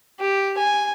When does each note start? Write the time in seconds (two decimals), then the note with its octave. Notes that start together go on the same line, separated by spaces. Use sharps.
0.20 G4
0.58 G#5